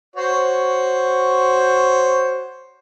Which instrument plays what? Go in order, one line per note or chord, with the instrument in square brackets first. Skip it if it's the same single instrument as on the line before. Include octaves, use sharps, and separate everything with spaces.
[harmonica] F#4 C5 C#5